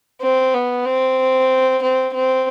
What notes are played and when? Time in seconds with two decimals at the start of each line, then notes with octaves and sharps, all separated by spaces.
0.21 C4
0.54 B3
0.85 C4
1.82 C4
2.14 C4